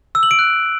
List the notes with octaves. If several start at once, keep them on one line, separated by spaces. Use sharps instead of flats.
E6
F#7
D7
F#6